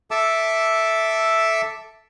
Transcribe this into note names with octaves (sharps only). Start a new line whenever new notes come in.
A4 E5 A5 D6 E6